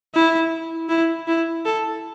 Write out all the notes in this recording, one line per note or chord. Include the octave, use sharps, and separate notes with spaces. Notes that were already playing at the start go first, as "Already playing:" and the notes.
E4
E4
E4
A4